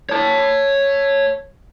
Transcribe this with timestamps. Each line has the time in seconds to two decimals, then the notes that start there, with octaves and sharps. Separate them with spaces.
0.09 C#5 A5